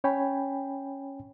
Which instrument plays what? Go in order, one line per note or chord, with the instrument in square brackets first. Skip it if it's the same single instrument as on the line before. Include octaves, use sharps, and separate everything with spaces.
[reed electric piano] C#4 C#5 G5 G#5 B5